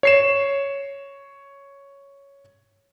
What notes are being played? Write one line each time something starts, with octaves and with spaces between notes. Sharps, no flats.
C#5 C7 E7